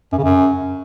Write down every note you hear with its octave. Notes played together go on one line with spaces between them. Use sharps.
F#2
C#3
F#2